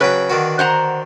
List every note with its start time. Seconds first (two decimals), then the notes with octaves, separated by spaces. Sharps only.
0.01 C#3 F#3 B4 G5
0.30 D3 D#3 F#4
0.59 C5 F#5 A#5